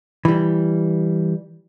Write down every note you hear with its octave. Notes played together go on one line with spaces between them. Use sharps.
E3 G3